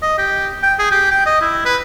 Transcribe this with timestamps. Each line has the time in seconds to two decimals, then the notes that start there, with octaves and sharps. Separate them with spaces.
0.02 D#5
0.18 G4
0.63 G5
0.79 G#4
0.91 G4
1.11 G5
1.26 D#5
1.41 E4
1.65 B4